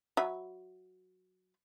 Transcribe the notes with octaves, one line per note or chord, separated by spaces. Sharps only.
F#3 E5 B5